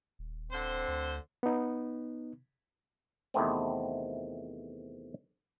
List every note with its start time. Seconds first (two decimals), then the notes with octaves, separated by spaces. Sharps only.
0.19 D#1
0.51 D3 C4 C5
0.88 D2
1.43 B3 D#4
3.34 E2 C3 D#3 A3 B3 C4